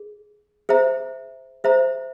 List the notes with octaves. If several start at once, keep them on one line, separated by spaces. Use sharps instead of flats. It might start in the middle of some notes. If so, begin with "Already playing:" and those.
Already playing: G#4
G#4 C5 E5 A#5
G#4 C5 E5 A#5